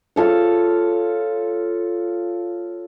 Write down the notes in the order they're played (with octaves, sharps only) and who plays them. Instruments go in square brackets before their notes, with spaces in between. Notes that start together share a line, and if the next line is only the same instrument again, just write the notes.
[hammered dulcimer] F4 A4 C#5